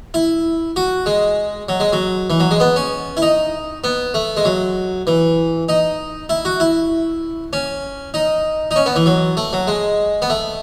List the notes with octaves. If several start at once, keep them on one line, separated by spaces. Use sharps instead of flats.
E4
F#4
G#3
F#3
G#3
F#3
E3
F#3
G#3
B3
C#4
E4
D#4
B3
A3
G#3
F#3
E3
D#4
E4
F#4
E4
C#4
D#4
D#4
C#4
B3
E3
F#3
A3
F#3
G#3
B3
A3